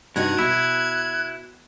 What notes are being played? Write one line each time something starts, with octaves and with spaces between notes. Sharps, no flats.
G2 C3 D#4 F#4 F#6 G#6
B2 E4